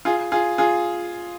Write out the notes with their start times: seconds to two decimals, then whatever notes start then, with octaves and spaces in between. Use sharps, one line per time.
0.05 F4 G#4
0.32 F4 G#4
0.58 F4 G#4